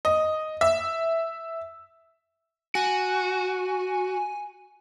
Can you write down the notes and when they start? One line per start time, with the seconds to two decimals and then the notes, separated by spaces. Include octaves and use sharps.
0.05 D#5
0.61 E5
2.75 F#4 G#5